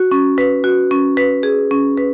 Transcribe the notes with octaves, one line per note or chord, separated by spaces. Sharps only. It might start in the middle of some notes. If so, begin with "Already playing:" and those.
Already playing: F#4
C#4
B4
F#4
C#4
B4
G#4
C#4
B4